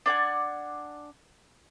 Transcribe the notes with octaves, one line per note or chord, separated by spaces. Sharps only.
D4 D5 F#5 G#5